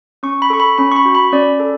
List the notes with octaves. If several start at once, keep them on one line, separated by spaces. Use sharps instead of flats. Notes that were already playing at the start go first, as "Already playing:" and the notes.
C#4 C#6
B5
A4 C#6
B5
C#4 B5
C#6
B5
F#4
B5
C#4 D5
A4